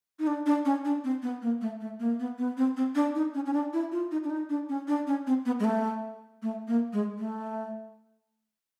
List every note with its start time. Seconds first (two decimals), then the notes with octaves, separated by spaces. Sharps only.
0.19 D#4
0.27 D4
0.46 D4
0.65 C#4
0.85 D4
1.04 C4
1.23 B3
1.42 A#3
1.61 A3
1.81 A3
2.00 A#3
2.20 B3
2.38 B3
2.57 C4
2.77 C4
2.95 D4
3.15 D#4
3.34 C#4
3.46 C#4
3.53 D4
3.73 E4
3.92 F4
4.11 D#4
4.24 D4
4.30 D#4
4.50 D4
4.69 C#4
4.88 D4
5.07 C#4
5.27 C4
5.46 B3
5.60 G#3
5.64 A3
6.42 A3
6.68 A#3
6.93 G#3
7.19 A3